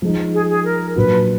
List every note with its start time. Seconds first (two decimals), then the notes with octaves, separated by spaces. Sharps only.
0.02 F3 G#3 D#4
0.34 G#4
0.49 G#4
0.64 A#4
0.95 A#2 F#3 D4 F#4 B4